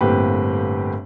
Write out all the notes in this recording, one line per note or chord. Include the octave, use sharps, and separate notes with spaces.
G1 A2 A#3 C4 G4 B4